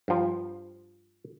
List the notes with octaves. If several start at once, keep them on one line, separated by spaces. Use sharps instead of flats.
G2 F3